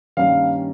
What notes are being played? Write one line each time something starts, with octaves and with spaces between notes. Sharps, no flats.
G2 D#3 A#3 C#4 F5